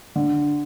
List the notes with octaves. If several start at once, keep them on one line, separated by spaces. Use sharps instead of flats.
D3